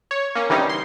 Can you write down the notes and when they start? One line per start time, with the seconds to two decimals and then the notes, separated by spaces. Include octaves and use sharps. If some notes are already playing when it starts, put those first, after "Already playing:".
0.11 C#5
0.35 A#3 C#4
0.50 D3 E3 G3 C4 C#4 D#4
0.69 C6